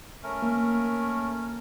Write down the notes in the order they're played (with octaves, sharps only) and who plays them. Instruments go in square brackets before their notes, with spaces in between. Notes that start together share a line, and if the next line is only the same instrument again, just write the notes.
[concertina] A3 C#4 A#4
[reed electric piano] A#3